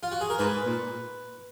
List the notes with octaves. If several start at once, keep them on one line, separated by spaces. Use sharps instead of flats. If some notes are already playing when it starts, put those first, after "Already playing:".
F4
F#4
G#4
A#4
G#2 B4
A#2